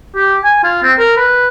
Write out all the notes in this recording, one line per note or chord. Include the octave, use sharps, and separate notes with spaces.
G4
G#5
F4
C4
A#4
B4